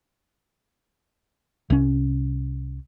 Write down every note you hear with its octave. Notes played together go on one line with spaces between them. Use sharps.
C2 C#4